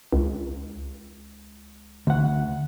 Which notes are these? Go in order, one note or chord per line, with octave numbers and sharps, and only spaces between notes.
C#2
D2 F#5